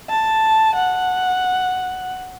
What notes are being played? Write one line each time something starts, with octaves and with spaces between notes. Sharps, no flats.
A5
F#5